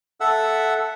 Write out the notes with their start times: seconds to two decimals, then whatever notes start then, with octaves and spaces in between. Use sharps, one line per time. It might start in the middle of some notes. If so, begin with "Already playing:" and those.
0.20 A4 E5 F#5 E6